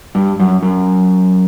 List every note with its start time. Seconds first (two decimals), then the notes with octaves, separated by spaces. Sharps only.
0.15 G2
0.40 F#2
0.63 F#2